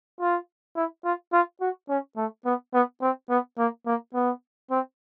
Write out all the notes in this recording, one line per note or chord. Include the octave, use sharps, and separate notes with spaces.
F4
E4
F4
F4
F#4
C#4
A3
B3
B3
C4
B3
A#3
A#3
B3
C4